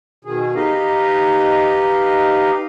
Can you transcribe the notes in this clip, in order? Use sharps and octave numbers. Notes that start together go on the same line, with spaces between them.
B2 D#3 G#4
D#4 G4 B4 D#5 F5